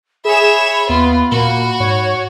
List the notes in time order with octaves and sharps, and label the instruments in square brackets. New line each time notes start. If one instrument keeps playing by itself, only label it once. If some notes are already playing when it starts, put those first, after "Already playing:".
[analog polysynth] G#4 E7 [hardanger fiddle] C#5 E5 [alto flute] B5
[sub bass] D#2 [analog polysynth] B3 [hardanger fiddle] F4
[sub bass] A#2 [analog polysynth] A#3 [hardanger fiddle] F#4
[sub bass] G#2 [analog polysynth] C#5